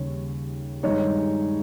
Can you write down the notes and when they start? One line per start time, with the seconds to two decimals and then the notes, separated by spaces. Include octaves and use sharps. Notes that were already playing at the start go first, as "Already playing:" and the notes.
Already playing: D#2 C#3 G3 C#5
0.83 G2 D#3 G#3 D#4 C#5